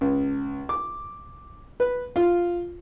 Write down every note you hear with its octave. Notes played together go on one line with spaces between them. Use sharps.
C#2
D6
B4
F4